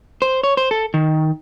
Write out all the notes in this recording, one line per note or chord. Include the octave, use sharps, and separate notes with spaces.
C5
C#5
C5
A4
D#3